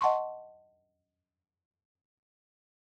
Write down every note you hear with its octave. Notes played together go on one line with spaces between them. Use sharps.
D#5 F#5 A5 C6 C#6